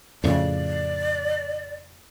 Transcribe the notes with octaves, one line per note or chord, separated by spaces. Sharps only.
F2 A2 C#3 D5